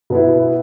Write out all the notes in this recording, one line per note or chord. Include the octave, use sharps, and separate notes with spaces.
B2 B3 E4